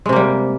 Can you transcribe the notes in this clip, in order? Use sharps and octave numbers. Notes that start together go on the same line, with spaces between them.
C3 G3 G#3 A#3